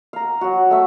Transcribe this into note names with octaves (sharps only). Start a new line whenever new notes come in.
F5 A#5
F#3 F#4
A3 E5